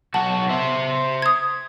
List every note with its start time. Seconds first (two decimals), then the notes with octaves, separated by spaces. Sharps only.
0.14 B1 F#4 A5
0.49 C5 E5
1.22 D#6 G#6